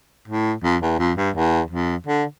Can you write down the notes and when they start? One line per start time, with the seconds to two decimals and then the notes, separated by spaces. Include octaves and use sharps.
0.28 A2
0.64 F2
0.82 E2
0.99 F2
1.17 G2
1.35 E2
1.71 F2
2.07 D3